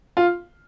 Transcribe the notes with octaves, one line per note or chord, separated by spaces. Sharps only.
F4